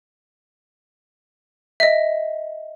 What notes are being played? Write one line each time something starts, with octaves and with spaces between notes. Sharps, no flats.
D#5 E5